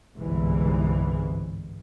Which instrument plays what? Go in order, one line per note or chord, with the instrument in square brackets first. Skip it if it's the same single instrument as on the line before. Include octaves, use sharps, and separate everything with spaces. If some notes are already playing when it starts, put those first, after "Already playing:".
[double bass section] G1 C2 G#2 E3